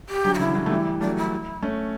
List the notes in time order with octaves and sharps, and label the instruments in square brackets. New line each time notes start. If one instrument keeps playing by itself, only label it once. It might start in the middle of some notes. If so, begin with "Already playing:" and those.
[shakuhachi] G4
[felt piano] D3 F#3
[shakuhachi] F#4
[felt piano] C#3 E3 [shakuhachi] E4
[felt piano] D3 F#3
A3
E3 G3
[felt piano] F#3 A3 [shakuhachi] D4
[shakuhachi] E4
[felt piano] A3 C#4